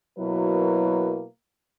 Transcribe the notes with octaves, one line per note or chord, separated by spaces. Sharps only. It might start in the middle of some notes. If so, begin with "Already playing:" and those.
B2 F#3 A#3 E4 A#4 B4